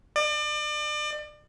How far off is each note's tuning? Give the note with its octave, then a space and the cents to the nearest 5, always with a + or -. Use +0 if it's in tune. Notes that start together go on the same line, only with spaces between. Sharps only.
D5 +35